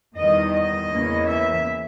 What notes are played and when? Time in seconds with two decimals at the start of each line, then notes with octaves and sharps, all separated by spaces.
0.16 E2 D#3 G3 D#5
0.53 D#5
0.90 E2 C#3 E3 A#3 C#4
1.26 E5